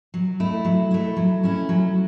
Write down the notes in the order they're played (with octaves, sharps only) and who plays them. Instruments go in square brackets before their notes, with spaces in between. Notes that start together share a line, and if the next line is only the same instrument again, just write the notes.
[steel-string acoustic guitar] F#3
A3 E4
F#3
A3 E4
F#3
A3 C#4 E4
F#3